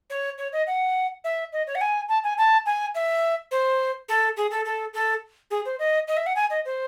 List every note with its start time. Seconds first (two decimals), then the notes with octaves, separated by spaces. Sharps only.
0.10 C#5
0.38 C#5
0.53 D#5
0.67 F#5
1.24 E5
1.53 D#5
1.67 C#5
1.75 F#5
1.81 G#5
2.09 A5
2.24 G#5
2.38 A5
2.66 G#5
2.95 E5
3.51 C5
4.09 A4
4.37 G#4
4.51 A4
4.65 A4
4.94 A4
5.51 G#4
5.65 C5
5.79 D#5
6.08 D#5
6.17 E5
6.26 F#5
6.36 G#5
6.50 D#5
6.65 C5